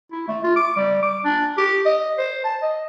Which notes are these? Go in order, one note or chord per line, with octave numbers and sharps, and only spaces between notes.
E4
A3
F4
D6
G3
D6
D4
G4
D#5
C5
A5
D#5